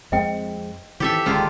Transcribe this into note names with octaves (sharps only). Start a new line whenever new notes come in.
F2 G#3 C4 D#5 G5
D#3 E3 C4 G4 A4 E5
D1 D3 D#3 G#3 A#3 F4